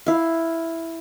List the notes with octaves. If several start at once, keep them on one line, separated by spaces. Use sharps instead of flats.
E4 F5